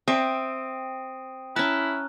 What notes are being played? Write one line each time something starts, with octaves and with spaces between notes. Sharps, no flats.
C4 E5 D#6 D7 D#7
C#4 E4 A5 A#5 F6 F#6